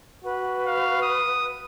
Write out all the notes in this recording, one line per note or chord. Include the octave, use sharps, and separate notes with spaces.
F#4 B4
F5
D#6